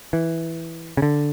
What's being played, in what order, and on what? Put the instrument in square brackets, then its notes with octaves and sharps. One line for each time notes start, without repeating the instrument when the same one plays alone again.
[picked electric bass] E3
C#3
D3